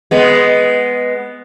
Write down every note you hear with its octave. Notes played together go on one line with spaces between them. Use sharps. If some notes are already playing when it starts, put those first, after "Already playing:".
G#3 B3